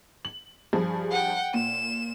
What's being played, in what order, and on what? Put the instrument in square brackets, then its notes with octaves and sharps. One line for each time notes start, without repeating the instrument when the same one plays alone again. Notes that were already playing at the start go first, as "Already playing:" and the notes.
[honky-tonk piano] F#7
G2 F3 G#4
[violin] F#5 G5
[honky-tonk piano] A#2 [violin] E7